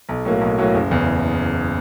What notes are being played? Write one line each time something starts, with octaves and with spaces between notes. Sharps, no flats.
B1
A2 F#3 A#3
B1
A2 F#3 A#3
F#1
E2 C#3